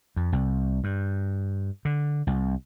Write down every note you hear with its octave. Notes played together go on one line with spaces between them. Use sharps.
F2
C2
G2
D3
C2